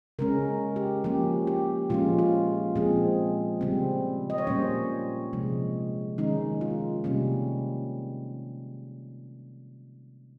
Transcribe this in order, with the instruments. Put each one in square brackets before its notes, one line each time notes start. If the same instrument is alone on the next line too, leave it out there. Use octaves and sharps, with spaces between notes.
[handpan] C#3 G#3 C#4 A#4
G4
F3 A#3 C#4 G4
G4
A#2 F3 G#3 C#4 F4
F4
A#2 F3 G#3 C4 G#4
C#3 G3 C4
D#5
C#5
A#2 G3 A#3 C#4 C5
C3 F3 G#3
D#3 G#3 C#4 D#4
F4
C3 G3 A#3 C#4